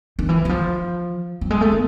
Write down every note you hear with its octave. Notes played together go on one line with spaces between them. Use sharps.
D#3
E3
E3
F3
F#3
G#3
A3
B3